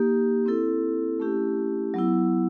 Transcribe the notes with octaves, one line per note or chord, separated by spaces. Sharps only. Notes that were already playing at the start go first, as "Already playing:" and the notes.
Already playing: A#3 D#4 G4
C4 E4 A4
A3 C#4 E4 G4
F#3 B3 E4